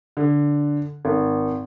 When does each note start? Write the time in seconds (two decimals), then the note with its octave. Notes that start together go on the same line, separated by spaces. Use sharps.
0.17 D3
1.05 G#1